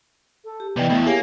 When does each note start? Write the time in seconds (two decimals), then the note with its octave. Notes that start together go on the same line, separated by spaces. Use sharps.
0.45 A4
0.60 G4
0.76 C3 E3 B3 D5 D#5 G5
0.89 E2 B2 A3 E4 E5
1.06 A#3 G4 G#4 C#5 F5 G#5